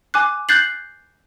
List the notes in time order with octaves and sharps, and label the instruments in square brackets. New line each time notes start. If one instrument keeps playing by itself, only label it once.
[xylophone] G#5 D6 F#6
F#6 G6 A6 C7 F#7